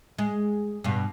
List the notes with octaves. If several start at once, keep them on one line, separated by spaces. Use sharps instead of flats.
G#3
G2 B2